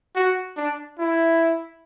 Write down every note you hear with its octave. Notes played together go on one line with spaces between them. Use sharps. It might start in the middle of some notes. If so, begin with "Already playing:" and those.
F#4
D4
E4